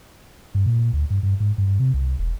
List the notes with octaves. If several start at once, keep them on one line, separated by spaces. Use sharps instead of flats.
G2
A#2
D2
G2
G2
G#2
G2
C3
C2
E1